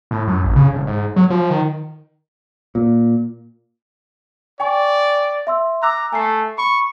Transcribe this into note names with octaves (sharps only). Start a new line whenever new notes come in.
A2
F#2
A1
C#3
E1
G#2
F#3
F3
D#3
A#2
D5 G5 G#5 C#6
E5 C6 E6
A#5 D6 E6 F#6
A3 G#5 C7
B5 C#6